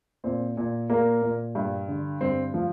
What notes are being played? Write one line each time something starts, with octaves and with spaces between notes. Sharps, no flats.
A#2 C4
A#2
A#2 A#3
A#2
G2
D3
G2 C4
F3